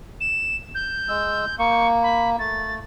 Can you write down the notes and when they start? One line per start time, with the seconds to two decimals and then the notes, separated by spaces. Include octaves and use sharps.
0.21 E7
0.75 G6
1.09 G#3 E6
1.59 A#3 C#6
2.03 B5
2.39 A3 A6